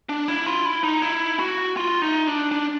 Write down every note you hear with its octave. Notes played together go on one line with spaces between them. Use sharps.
D4
E4
F4
E4
D#4
E4
F#4
F4
D#4
D4
D4